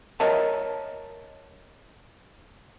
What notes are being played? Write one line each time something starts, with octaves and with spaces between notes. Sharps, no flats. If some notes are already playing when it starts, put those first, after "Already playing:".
A#4 C#5 D#5 E5 A5